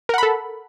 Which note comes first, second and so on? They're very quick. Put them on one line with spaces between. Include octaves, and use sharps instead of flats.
A#4 F#5 B5 A4